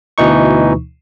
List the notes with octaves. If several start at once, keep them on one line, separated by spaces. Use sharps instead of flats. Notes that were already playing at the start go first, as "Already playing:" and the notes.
D2 B2 E3 D#4 C#6